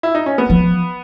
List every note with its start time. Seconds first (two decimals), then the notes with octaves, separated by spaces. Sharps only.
0.03 E4
0.15 D#4
0.26 C#4
0.38 B3
0.50 F3